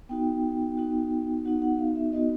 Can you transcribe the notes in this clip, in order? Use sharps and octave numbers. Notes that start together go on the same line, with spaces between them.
B3 D#4 F#4 G5
B3 D#4 F#4
B3 D#4 F#4 F#5
F#5
F5
E5
B3 D#4 F#4 D#5